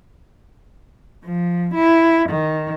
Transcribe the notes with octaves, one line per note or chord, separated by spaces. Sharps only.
F3
E4
D#3